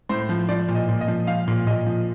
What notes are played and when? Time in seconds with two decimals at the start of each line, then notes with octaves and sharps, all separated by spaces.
0.09 A2 C5
0.29 F3
0.49 F3 D5
0.68 A#2
0.75 D#5
0.89 A#2
1.01 D#5
1.08 F3
1.27 F3 F5
1.48 A#2
1.67 A#2 D#5
1.86 F3